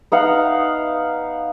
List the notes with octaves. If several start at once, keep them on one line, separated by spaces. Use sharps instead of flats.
B3 D#4 F5 F#5